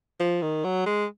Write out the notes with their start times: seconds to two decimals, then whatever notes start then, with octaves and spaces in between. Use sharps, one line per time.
0.20 F3
0.42 D#3
0.64 F#3
0.86 G#3